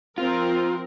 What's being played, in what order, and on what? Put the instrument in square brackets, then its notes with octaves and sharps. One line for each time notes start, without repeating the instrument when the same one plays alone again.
[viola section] F3 C4 A#4 [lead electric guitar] F4